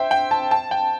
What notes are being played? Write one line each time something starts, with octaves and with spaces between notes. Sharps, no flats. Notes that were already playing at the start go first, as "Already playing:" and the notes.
Already playing: C5 E5 G5
G5
A5
A5
G5